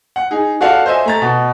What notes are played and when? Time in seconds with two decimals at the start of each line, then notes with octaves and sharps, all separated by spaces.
0.16 F#5
0.31 D#4 G#4
0.61 F#4 A4 D5 F5 F#5 A5
0.86 C5 D#5 E5 G#5
1.06 A3 A#5 A6
1.22 B2